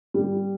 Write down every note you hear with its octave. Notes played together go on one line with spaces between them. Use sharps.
G3